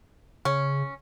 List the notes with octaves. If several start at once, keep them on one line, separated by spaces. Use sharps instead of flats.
C#3 C#4